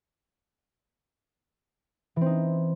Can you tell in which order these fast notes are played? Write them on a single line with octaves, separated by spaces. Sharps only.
E3 C4 D#4